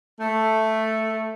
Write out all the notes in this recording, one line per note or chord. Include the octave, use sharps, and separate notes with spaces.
A3